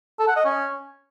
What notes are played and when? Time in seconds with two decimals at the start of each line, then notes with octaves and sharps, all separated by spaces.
0.19 A4
0.28 F#5
0.37 D#5
0.45 C#4